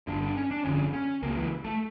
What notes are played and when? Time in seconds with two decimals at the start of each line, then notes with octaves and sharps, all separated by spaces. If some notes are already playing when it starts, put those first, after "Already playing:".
0.07 G1 G2 D3 D4
0.22 D4
0.36 C#4
0.51 D4
0.64 G1 F2 D3 C#4
0.93 C#4
1.22 C#2 C#3 A#3
1.36 E3
1.64 A3